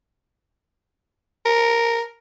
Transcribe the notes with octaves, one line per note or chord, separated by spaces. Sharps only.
A#4